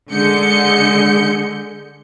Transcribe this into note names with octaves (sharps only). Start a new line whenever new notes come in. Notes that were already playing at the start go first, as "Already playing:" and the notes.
D3 G#3 G6 C#7